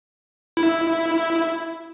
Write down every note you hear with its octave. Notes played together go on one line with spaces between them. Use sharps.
E4